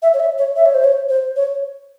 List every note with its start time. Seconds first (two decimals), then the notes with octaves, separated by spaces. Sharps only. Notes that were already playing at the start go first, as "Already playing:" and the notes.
0.03 E5
0.14 C#5
0.20 E5
0.38 C#5
0.56 E5
0.66 C#5
0.74 C5
0.84 C#5
1.09 C5
1.36 C#5